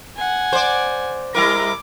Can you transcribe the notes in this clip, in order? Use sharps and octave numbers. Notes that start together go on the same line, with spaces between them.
F#5 G#5
C5 D5
G3 E4 A#4 D6